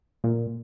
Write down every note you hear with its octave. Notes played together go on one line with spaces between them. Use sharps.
A#2